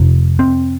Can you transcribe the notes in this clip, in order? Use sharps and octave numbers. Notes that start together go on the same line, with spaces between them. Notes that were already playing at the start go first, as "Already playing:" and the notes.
Already playing: F2 C3
C4